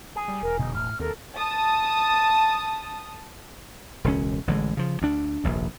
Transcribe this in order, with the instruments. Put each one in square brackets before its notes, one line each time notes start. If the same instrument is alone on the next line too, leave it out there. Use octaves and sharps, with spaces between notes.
[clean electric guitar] G#4
[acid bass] G3
[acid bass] E1 [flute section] A#4
[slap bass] B2 D3 F#3 [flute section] D#4
[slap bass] A2 [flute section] F6
[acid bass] D#2 [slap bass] C4 [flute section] A4 A#4
[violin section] A5 D#6
[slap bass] E1 C#2 C#4
A1 D3 F3 G#3
C#3 F3
D2 D4
F1 A#1 D#2